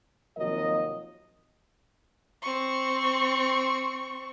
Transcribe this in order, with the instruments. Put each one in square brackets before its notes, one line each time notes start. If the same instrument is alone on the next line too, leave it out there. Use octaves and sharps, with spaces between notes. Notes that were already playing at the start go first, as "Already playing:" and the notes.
[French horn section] D#2 C3 F3 F#3 A#4 D#5
[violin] C4 C#6